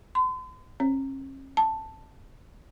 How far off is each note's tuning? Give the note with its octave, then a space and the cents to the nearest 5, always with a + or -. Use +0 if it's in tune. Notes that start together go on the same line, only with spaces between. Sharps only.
C6 -45
C#4 -40
A5 +5